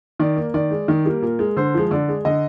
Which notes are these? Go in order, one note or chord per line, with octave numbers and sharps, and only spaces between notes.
D#3 D5
A#3
D#3 D5
G#3
D#3
G3 A#3
A#2 A#4
G#3
D3 C5
F3 G#3
D3 D5
G#3
D3 D#5